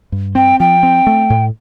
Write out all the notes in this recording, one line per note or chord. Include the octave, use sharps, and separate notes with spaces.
G2
C4 G5
F3 G5
C4
A3
A2